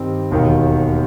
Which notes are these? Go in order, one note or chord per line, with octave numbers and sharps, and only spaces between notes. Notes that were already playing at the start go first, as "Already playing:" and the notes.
Already playing: G2 D#3 G3 C4 D#4
E1 D#2 D#3